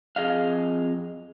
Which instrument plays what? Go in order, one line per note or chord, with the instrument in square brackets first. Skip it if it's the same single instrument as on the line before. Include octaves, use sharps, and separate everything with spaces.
[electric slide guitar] F2 G#4 D#5 F5